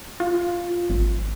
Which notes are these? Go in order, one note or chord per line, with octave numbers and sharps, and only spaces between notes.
F4
G#1